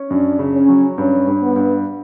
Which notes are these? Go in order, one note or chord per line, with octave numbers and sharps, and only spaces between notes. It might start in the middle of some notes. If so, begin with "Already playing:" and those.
Already playing: C#4
F#2 D4
C#3
C#4
F#3
G2 C#4
G2
B3
G2